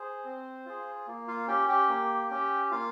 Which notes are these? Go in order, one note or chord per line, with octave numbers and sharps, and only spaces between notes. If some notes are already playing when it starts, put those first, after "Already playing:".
Already playing: G#4 C5
C4
F4 G#4
A#3
F4 F5
C#4 G4 G5
G4 G5
A#3
C#4 G4
A#3 F4 F5